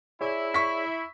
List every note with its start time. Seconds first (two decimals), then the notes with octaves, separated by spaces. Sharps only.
0.21 E4 G#4 C#5 D5
0.54 C#6 B6